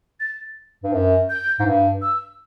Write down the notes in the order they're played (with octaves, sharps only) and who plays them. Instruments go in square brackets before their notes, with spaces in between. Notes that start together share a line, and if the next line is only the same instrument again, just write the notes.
[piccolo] A6
[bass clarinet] G2
F#2
[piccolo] G6
[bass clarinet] G#2
G2
[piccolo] E6